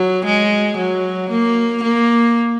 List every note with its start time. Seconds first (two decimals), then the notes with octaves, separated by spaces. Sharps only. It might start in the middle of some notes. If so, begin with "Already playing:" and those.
Already playing: F#3
0.25 G#3
0.77 F#3
1.30 A#3
1.83 A#3